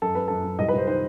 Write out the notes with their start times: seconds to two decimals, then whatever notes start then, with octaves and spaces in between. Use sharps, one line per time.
0.02 F#2 A4
0.15 F#2 B4
0.28 F#2 A4
0.44 F#2
0.59 C2 D#5
0.68 B4
0.73 C2 C5
0.87 D#3 C5